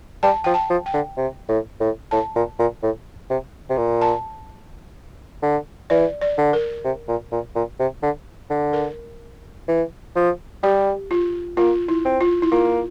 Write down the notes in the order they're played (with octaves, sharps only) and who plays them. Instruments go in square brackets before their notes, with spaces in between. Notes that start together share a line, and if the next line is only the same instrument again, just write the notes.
[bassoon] G3 [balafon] A5
[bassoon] F3 [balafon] G5
[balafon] A5
[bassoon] F3
[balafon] G5
[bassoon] D3
C3
A2
A2
[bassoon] A2 [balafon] A5
[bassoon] A#2
A#2
A2
C3
C3
A#2
[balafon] A5
[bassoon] D3
[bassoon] E3 [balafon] D5
[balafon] D5
[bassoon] D3
[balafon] A#4
[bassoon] C3
A#2
A#2
A#2
C3
D3
D3
[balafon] A#4
[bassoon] E3
F3
[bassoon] G3 [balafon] G4
[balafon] F4
[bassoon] A#3 [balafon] F4
[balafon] E4
[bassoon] C4
[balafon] F4
E4
[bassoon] A#3 [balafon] F4